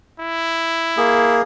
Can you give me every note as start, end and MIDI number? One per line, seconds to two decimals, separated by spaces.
0.20 1.41 64
0.97 1.42 58
0.97 1.42 68